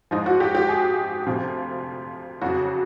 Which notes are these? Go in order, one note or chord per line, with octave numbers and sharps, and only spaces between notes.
G#2 F3 D#4
F#4
G4
G4
G#4
D2 C3 F3
F2 C#3 F#3 F#4